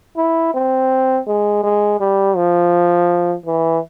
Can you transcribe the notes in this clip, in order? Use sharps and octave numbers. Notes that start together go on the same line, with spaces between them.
E4
C4
G#3
G#3
G3
F3
E3